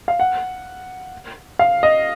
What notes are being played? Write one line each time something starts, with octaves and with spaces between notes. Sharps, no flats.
F5
F#5
F5
D#5